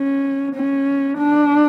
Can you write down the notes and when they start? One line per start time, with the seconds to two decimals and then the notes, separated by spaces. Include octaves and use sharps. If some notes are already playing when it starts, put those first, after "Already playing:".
Already playing: C#4
0.55 C#4
1.18 D4